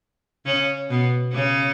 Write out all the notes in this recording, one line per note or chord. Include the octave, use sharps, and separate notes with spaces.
C#3 C#4
B2 B3
C#3 C#4